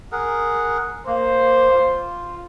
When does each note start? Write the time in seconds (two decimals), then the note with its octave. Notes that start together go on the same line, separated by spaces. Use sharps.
0.12 G#4 A#4 F#5
1.07 A#3 C5
1.74 F4